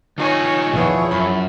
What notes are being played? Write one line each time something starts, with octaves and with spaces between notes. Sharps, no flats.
D#3 D#4 F4 C#5 G#5
E2 B2 F3 E4 G#4 C#5
F#2 B5